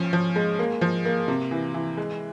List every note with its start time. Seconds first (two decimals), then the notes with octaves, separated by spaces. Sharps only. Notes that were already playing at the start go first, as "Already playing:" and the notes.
Already playing: F3 C#4
0.13 F3
0.36 G#3
0.59 A#3
0.81 F3
1.05 A#3
1.28 C3
1.51 E3
1.74 E3
1.97 G#3